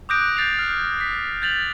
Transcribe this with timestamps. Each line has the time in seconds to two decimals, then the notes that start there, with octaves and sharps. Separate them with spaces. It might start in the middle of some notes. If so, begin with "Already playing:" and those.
0.09 D6 D#6 F#6 G6 A#6 D7
0.37 G6 A6 C7 F7
0.54 F6 C7
1.01 B6
1.42 G6 A6 F7 F#7